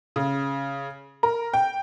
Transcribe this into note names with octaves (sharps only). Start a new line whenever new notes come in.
C#3
A#4
G5